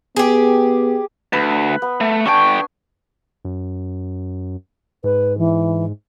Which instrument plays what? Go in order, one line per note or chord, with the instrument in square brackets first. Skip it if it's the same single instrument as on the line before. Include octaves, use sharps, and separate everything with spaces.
[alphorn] B3 [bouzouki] G4 G#4
[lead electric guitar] D2 [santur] B4
[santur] B3
[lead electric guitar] A3
[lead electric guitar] D3 G5 [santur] D4 G#5 C#6
[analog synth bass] F#2
[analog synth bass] G#2 [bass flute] B4
[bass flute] E3